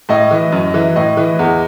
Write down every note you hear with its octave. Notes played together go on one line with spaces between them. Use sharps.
A2 D#5
E3
F#2
E3
A2 D#5
E3
E2